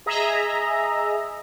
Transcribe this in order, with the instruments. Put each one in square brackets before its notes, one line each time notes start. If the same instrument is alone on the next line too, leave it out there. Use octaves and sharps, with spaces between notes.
[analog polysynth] G#4 D#5 E5 A#5